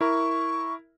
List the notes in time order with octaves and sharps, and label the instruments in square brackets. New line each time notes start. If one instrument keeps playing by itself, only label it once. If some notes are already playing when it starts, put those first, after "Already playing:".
[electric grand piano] E4 A#4 [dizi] C#6